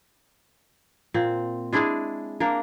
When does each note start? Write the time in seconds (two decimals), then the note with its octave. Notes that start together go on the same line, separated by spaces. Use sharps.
1.14 A#2 C4
1.73 G#3 D4 E4 G#4
2.40 A#3 D4 A#4